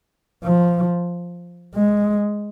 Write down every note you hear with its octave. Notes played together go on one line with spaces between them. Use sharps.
F3
G#3